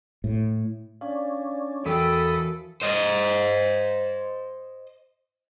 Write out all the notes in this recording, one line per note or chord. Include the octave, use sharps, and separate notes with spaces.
A2
C#4 D4 D5 F5
E2 E3 F#4 A4 A#4 G5 B5 D#6
C5 D#5